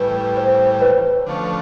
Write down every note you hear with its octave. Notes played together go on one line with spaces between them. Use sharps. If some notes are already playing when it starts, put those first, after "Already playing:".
Already playing: A2 E3 G3 B4
C5
B4 C#5
D3 F3 A3 C#4